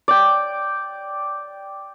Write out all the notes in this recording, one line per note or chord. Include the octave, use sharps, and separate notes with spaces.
D5 G5